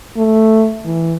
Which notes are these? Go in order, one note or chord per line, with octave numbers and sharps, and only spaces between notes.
A3
E3